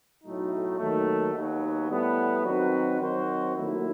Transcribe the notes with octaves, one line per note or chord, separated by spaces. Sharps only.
B1 A2 F#3 A3 D#4
D#2 D#3 F#3 A3
D#2 D#3 F#3 B3
A2 G3 B3
D#3 F#3 C4 F#4 B4
D#3 F#3 C4 F#4 C5
D#2 D#3 F#3 A3 E4